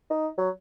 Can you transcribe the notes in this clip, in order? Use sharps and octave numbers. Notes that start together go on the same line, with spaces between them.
D#4
F#3